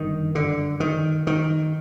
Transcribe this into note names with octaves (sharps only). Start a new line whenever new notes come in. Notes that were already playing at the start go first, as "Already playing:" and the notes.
Already playing: G1 F#2 D#3
D3
D#3
D#3